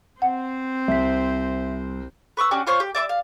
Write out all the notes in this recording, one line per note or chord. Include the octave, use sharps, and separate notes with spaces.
C4 C5 F#5
C2 E5 B6
B4 C#6 D6 E6
C#4 D4 F#4 G4
F4 C5 C#5 C#6
G4
D5 E5 C6 D6
F5